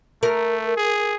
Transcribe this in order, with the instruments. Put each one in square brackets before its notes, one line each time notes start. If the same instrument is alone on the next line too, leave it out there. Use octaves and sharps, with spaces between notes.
[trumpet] A3 [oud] A#4
[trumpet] G#4